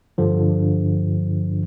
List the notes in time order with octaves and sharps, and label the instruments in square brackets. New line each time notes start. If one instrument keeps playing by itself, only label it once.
[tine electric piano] G2 D3 F3